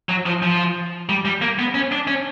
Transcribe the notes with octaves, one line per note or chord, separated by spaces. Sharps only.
F#3
F3
F3
G3
G3
A#3
B3
C#4
D4
C#4